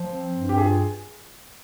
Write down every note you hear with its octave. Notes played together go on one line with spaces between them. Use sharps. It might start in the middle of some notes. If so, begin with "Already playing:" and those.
Already playing: F3 C5
C4
G2
G4
F4 G#4